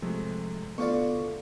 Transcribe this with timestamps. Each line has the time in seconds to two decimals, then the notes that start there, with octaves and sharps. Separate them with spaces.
0.02 C3 F3 G#3 A3
0.78 D2 B3 F4 D5 C#6